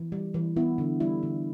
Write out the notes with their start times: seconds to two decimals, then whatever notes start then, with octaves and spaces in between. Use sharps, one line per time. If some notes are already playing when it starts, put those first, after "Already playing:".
Already playing: E3
0.12 G3
0.34 E3
0.56 B3 E4
0.78 D3
1.00 G3 E4
1.23 D3